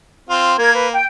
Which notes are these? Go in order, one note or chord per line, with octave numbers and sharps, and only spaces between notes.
C4 F4
A#3 A#4 G#6
B4
G5